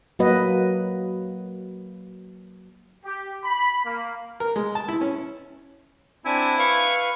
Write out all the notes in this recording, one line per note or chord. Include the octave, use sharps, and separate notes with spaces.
F#3 A#3 F#4 B4 D#5
G4
B5
A#3
A#4
G#3
A5
E4
C#4
C4 D4 E4 G#5
B4 F5 C#6